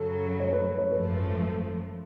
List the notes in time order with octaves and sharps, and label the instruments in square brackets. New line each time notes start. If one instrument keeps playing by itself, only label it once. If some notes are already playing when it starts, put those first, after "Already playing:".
Already playing: [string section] F#2 C#3 F#3 [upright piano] A4
[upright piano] C#5
B4
C#5
[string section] G#1 F#2 F3 A3 [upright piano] B4